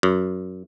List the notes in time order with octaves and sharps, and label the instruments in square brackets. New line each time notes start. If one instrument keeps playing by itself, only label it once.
[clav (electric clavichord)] F#2